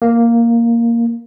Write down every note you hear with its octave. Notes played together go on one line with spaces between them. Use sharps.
A#3